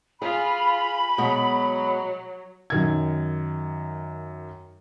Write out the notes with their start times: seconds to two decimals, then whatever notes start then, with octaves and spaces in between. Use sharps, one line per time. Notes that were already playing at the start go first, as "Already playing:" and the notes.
0.22 F4 G#4 B5
1.18 B2 F#3 G#3
2.70 F#2 D#3 G#6